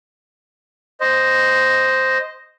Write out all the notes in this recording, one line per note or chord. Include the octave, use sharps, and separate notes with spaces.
C5 D#5